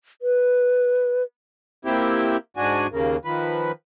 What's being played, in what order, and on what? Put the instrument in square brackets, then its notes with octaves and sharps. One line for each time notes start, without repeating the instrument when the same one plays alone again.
[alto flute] B4
[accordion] A#2 C4 E4 G4
G#2 D4 F#4 G#5
D#2 C#3 A#3
D#3 F3 B4